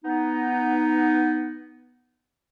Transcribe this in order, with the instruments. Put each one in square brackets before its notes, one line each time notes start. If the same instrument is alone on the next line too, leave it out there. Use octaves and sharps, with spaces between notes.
[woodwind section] B3 D#4